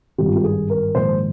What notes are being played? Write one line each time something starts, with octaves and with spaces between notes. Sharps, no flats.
G#1 G2 D#3 G4
F4
G4
G#4
A#4
A#1 G#2 D#3 C5